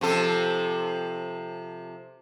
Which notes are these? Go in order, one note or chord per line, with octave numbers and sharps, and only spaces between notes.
C3 F3 A4